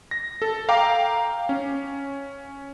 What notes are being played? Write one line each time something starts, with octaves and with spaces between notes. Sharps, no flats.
A#6
A4
F5 G5 A#5 D6
C#4